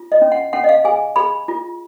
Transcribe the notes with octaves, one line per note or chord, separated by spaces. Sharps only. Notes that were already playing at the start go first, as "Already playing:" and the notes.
Already playing: F4
D#5
C#4
F#5
C#4 F#5
D#5
F5
G#4 G#5
G#4 B5
F4